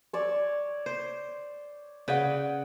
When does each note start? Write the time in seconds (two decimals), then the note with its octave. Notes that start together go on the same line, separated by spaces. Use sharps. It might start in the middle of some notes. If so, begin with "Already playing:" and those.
0.13 C#5 D5 E6
0.86 C5
2.08 C#3 B4 D5 F#5 G5